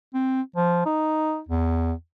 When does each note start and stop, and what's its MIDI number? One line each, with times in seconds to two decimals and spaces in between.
0.14 0.42 60
0.56 0.82 53
0.86 1.40 63
1.48 1.93 40